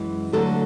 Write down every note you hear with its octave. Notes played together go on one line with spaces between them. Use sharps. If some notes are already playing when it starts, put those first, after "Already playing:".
Already playing: F#2 E3 G#3
D2 D3 F#3 A3 A4